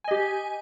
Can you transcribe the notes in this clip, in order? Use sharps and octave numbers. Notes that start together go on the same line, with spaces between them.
G4 D#5 G#5